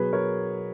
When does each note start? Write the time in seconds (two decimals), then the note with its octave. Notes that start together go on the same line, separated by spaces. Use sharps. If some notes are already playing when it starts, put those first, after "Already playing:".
Already playing: B2 F#3 G#4 B4
0.13 A#4 C#5